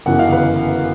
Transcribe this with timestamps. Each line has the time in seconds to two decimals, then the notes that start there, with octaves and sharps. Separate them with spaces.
0.06 G1 F#2 C#3 E3 F#5
0.19 F5
0.32 B4